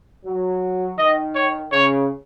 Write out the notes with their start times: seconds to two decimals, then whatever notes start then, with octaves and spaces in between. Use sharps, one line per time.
0.25 F#3
0.98 D#3 D#5
1.35 C#5
1.72 C#3 C#5